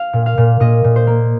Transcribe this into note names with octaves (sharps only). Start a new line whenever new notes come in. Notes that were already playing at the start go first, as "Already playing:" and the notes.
Already playing: F5
A#2
F5
A#2
A#2 D#5
A#2
C5
A#3